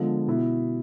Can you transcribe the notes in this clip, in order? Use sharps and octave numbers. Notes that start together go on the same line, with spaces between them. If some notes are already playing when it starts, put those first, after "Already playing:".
Already playing: D3 F3 G#3 B3 F4
B2 B3 E4